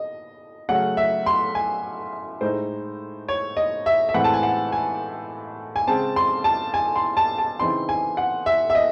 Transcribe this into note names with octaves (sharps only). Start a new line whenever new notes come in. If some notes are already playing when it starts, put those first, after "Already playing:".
Already playing: D#5
C#3 F#3 A3 C#4 F#5
E5
C6
G#5
A2 G#3 D#4 C5
C#5
D#5
E5
E5
A2 E3 G#3 C4 F#5
A5
G#5
F#5
G#5
G#5
C#3 G#3 C4 A5
C6
A5
G#5
C6
A5
A5
C#3 E3 C4 D#4 C6
G#5
F#5
E5
E5
D#5